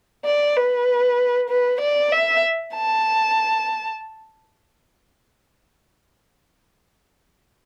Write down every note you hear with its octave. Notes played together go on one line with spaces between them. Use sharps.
D5
B4
B4
D5
E5
A5